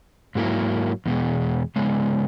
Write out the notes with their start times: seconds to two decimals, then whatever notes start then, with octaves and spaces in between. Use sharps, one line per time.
0.35 G#2 F#3 A#3 E4 A#4
1.06 E2 B2 G#3
1.76 C#3 G#3 B3